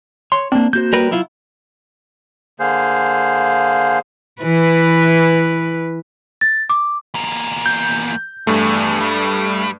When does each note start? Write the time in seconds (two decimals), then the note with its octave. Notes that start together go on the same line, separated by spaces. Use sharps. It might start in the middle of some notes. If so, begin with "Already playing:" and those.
0.32 C#5 C6
0.52 A#3 C4 D4
0.73 A#3 F#4 C5 G6
0.93 G3 A#4 B4
1.11 F#3 E4 F4
2.60 D3 A#3 G#4 C5 F5
4.42 E3 B4
6.41 A6
6.70 D6
7.14 E2 A#3
7.66 G6
8.47 E2 G2 A3
9.01 G3